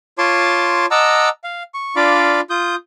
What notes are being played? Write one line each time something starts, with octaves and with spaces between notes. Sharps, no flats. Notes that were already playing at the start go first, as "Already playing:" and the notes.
F4 C#5 A5 C6 D6
D#5 F#5 A5 A#5 D6 E6
F5
C#6
D4 F4 D5 F5 B5 D6
F4 D#6 G6